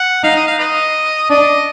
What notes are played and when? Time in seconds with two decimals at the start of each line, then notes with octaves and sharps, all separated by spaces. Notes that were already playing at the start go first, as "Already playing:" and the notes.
Already playing: F#5
0.23 D#4 F5
0.36 D#5
0.47 F5
0.59 B4 D#5
1.30 D4 D#5